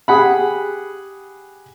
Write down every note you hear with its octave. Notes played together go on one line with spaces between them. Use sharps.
G4 G#4 F#5 B5